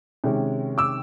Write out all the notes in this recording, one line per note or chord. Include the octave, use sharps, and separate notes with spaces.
C3 D#3 G#3 C#4
D6 E6